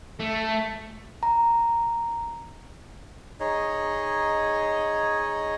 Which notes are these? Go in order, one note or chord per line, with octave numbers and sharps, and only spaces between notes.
A3
A#5
D#4 G#4 C#5 D#5